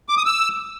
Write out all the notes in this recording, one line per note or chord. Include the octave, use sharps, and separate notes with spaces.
D6
D#6
E6